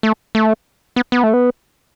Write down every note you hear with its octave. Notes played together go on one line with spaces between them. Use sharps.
A3
A3
B3
B3
A3
B3